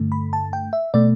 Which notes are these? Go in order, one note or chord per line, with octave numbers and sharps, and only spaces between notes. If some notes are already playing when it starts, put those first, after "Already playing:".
Already playing: G2 D3 A3
B5
A5
G5
E5
B2 A3 D5